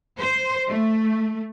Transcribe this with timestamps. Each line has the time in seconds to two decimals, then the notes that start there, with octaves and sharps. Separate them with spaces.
0.19 C5
0.69 A3